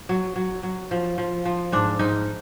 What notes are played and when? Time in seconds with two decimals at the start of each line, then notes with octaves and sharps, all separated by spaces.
0.09 F#3
0.36 F#3
0.63 F#3
0.91 F3
1.18 F3
1.45 F3
1.72 G#2 D4
1.99 G#2 D#4